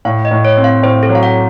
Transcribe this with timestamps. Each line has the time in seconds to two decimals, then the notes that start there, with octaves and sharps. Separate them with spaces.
0.05 A2 F5
0.25 D#5
0.31 A2
0.45 C#5
0.57 C4
0.64 F5
0.83 A2 C5
1.03 A4
1.09 F#3
1.15 F5
1.23 F#5